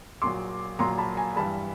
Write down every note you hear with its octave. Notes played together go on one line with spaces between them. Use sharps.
A#1 A#2 F#3 C6 D6
A#1 A#2 F#3 A#5 C6
A5 B5
G#5 A#5
G2 E3 G3 A5 B5